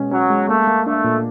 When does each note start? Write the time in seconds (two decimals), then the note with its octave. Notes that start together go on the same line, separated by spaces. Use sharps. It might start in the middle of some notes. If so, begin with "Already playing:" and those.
Already playing: B2 G#3 C#4
0.11 F#3 C#4
0.30 G#3
0.49 A3 A#3
0.67 A#3
0.86 A3 D4
1.04 A#2